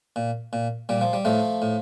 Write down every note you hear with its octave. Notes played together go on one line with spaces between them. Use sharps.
A#2
A#2
A#2 G3
F3
G3
A2 F3 A3
A2